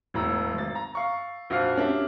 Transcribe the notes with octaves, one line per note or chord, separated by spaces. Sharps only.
E1 A2 A#5 E6
G#1 A6
A#5
F5 C#6
A#1 F2 F#4 F5 F6 C7
C#4 D4 G4 A#4 E5